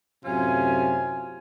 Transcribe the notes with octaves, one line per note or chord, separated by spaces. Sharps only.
F#2 A2 C3 C#4 F4 G#5